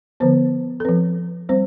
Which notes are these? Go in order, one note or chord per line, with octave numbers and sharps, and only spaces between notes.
D3 F3 B3 C5
A4
F3 C4 B4
G3 C4 C5